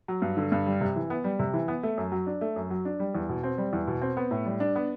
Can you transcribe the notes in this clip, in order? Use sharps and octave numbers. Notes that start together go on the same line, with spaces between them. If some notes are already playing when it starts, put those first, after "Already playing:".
F#3
G2
D3
G2
G3
C3
E3
B3
G3
C3
E3
B3
A3
F#2
F#3
D4
A3
F#2
F#3
D4
G3
E2
B2
C4
G3
E2
B2
C4
B3
A2
G3
D4
B3